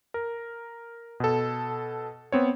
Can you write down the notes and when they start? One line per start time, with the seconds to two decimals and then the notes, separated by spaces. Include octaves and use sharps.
0.14 A#4
1.20 B2 A4
2.32 B3 C4 C#5